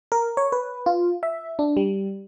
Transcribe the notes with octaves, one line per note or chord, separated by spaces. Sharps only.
A#4
C#5
B4
F4
E5
D4
G3